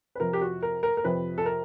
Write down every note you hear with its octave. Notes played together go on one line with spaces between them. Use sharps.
B4
F2 C3 F3 A#4
G4
F#4
A#4
A#4
A#4
F2 C3 F3 B4
A4
A#4